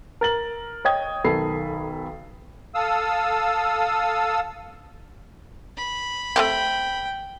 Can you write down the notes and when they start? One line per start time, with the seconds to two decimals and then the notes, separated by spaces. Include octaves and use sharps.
0.21 A#4 A6 F#7
0.85 C#5 D#5 G5 D#6 G#6
1.24 B1 D#3 A4 B5 C7
2.75 A4 F5 D#6 E6
5.77 B5
6.36 A3 C4 G4 G5